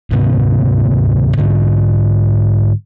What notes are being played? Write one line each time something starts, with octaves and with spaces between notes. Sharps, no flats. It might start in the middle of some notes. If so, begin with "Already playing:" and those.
D2 G#2 C3 B3
G#2 D3